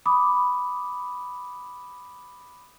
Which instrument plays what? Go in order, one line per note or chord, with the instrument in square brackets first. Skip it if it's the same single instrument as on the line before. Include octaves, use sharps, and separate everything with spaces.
[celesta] B5 D6 D#6